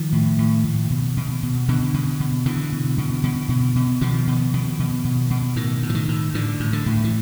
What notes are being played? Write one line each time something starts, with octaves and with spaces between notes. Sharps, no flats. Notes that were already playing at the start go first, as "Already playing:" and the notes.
Already playing: D#3 F3
A2
A2
A2
B2
B2
B2
B2 D3
B2
B2
B2 D3 E3
B2
B2
B2
B2
B2
B2 D#3 F3
B2
B2
B2
B2
B2
A2 D#3
A2
E3
D#3
A2
A2 D3
A2
D3
A2
E3